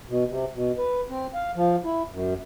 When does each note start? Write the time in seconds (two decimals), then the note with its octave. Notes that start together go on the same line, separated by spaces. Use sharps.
0.09 B2
0.29 C3
0.54 B2
0.78 B4
1.10 C4
1.34 F5
1.56 F3
1.84 E4
2.11 F#2